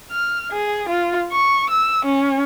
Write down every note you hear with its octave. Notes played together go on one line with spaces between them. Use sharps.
F6
G#4
F4
C#6
E6
C#4